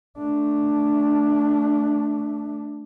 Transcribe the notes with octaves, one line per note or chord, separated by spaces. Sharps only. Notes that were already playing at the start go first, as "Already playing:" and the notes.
A3 D4